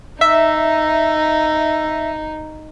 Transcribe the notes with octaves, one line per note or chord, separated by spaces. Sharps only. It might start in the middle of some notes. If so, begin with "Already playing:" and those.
D#4 E5